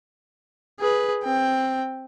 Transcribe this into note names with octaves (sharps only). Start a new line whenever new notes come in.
G#4 B4
C4 G5